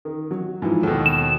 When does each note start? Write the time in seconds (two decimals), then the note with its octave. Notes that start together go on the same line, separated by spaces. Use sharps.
0.05 D#3
0.31 F#3
0.62 G#2 E3 F3
0.83 D#2 B2 A4
1.06 E7